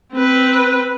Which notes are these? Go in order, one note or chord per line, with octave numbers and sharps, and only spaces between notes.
C4 B4